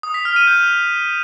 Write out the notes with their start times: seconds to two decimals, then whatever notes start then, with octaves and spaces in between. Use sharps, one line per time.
0.03 D#6
0.14 B6
0.25 F6
0.36 D#7
0.47 G6